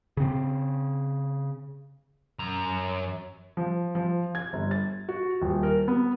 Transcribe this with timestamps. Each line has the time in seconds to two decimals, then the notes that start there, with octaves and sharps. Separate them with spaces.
0.17 C#3 C4
2.39 F#2 A#5
3.57 F3
3.95 F3
4.35 G#6
4.53 G1
4.71 A6
5.09 F#4
5.42 D#1
5.63 A#4
5.88 B3